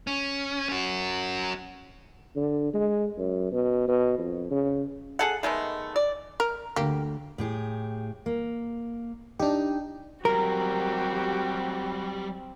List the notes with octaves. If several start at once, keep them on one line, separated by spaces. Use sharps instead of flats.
C#4
C#4 F#4
D3
G#3
F#2
B2
B2
F2
C#3
G#4 A4 F#5
D#3 G#3 A3 B3
D5
A#4
D2 D3 A#3 G4
A2 G4 G#4
A#3
D4 D#4 G4
F#3 G3 C4 F#4 G4 A#4